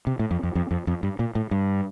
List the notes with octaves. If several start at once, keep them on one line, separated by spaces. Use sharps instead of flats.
C3
A2
F2
F2
F2
F2
F2
G2
A#2
A2
G2